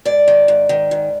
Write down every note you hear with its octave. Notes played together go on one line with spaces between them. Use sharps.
G#2 D5
D#3
G#2
D#3
G#2